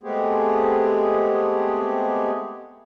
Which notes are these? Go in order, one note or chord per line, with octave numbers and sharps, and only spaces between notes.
G#3 A3 B3 C4 G4 G#4